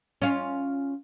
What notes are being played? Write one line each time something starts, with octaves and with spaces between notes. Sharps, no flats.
C#4 F4